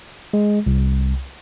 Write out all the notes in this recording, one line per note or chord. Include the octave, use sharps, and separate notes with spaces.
G#3
C2